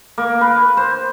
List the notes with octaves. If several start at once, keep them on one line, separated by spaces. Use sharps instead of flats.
A#3
B4
C5